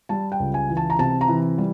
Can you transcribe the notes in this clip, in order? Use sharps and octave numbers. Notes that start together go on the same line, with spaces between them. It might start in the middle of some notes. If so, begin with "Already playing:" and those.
G3 A5
G5
C#2
G#5
E3
A5
A#5
C3 A5
A#5
E3
G3